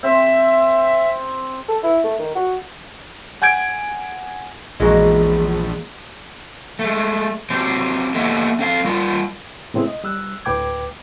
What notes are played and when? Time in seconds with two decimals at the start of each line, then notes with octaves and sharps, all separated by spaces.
0.03 C4 E5
1.69 A4
1.84 E4
2.04 A3
2.19 D#3
2.35 F#4
3.42 F#5 G#5 G6 G#6 D7
4.80 A#1 E2 G#3 A#3 F#4
6.79 G#3 A3
7.50 F#3 C4 G4 C5
8.14 A#3 B3 G4 A4 D#5 E5
8.59 C4 A4 F5
8.84 G3 F4 A#4
9.74 A2 C3 G#3 B3 C4 E4
9.88 D#5
10.04 G3 E6 F#6
10.45 D2 A2 B4 G5 D6 G#6